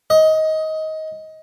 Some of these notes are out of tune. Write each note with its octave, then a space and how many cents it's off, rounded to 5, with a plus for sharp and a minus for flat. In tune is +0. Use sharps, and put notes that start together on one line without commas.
D#5 +20